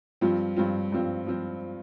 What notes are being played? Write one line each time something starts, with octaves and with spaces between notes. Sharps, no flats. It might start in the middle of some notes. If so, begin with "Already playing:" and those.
G2 F3 C4 F4
G2 F3 C4 F4
G2 F3 C4 F4
F3 C4 F4